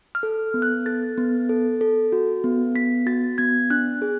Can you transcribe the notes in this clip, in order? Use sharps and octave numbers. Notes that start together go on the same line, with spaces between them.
F6
A4
B3
F#6
A4 A6
B3
A4
A4
F#4
B3
B3 B6
F#4 A6
B3 G#6
D4 F#6
G#4